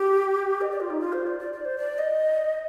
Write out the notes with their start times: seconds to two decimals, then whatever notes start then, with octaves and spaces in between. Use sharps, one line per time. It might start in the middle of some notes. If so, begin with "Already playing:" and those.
Already playing: G4
0.61 D#5
0.71 D5
0.80 F4
0.90 D#4
1.00 F4
1.13 C5
1.27 D5
1.39 D5
1.53 D5
1.65 C5
1.78 D5
1.98 D#5